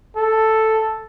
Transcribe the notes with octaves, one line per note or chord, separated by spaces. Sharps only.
A4